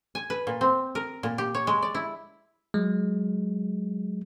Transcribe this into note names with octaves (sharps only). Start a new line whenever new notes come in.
G#5
B4
A#2
C4
A#4
A#2
G4
C#5
G#3
D5
E4
F#3 G#3